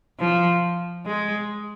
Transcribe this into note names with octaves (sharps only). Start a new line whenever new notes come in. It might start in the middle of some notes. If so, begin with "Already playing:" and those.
F3
G#3